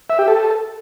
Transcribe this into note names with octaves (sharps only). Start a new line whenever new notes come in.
E5
G4
A4